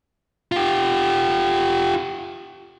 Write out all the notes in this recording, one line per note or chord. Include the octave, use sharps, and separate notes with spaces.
F4 G4